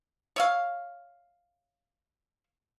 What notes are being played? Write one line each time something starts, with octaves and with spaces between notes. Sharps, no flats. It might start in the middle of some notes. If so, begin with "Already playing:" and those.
C#5 E5 F5